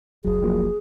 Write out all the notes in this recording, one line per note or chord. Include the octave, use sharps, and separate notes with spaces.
F1 C#2 F#3 G#4
F3 F#3 A#3